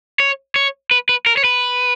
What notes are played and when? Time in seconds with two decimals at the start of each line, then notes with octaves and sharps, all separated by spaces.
0.20 C#5
0.56 C#5
0.91 B4
1.09 B4
1.26 A#4
1.37 C#5
1.44 B4